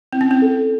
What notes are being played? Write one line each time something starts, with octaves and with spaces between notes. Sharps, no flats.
C4 E4
C#4
C4
A4